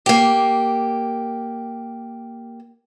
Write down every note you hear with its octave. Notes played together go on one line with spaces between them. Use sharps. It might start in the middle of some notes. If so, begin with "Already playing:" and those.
A#3 G4